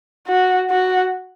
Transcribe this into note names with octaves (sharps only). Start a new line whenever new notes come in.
F#4
F#4